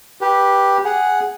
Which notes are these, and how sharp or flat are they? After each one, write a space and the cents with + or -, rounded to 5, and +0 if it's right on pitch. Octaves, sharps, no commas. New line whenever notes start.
G4 +0 B4 -20
G#4 +0 F#5 +0